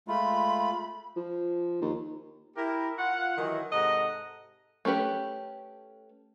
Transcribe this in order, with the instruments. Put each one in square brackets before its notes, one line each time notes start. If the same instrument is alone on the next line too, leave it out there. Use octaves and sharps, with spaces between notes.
[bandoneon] G#3 A3 F4 [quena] B5
[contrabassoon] F3
D#2
[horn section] E4 G4 A#4
F4 F#5
D#3 E3 F#3
G#2 C3 A4 D#5 F#5 A#5
[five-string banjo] A3 C#4 G4 B4